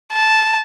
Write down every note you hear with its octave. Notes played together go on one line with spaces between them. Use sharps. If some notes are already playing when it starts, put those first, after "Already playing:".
A5